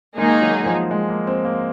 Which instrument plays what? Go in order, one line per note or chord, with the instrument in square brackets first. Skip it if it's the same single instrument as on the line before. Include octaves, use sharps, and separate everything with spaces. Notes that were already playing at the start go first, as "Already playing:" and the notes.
[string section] D#3 A#3 D#4 G#4 [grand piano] G#3
[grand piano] F#3
F3
G#3
A#3
C4
A#3